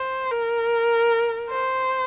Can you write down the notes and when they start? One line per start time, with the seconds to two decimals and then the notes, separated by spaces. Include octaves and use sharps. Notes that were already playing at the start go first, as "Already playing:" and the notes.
Already playing: C5
0.31 A#4
1.50 C5